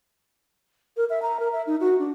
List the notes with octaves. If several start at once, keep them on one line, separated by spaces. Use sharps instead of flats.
A#4
E5
A#5
A#4
E5
D#4
F#4
D4